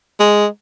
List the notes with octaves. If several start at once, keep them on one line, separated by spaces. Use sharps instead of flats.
G#3